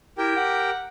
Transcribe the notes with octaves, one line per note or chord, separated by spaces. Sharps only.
E4 G4 A#4 G5
F#5